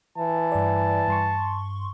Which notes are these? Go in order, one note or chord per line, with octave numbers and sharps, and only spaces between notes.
E3 A5
G2 D5
G2 C6 C#6